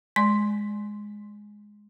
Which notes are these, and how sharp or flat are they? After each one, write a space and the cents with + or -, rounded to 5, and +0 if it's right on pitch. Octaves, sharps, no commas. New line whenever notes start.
G#3 +0 D5 +0 C6 +0